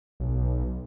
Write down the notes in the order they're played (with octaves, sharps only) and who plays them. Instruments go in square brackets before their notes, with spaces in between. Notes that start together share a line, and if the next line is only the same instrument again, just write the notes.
[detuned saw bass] B1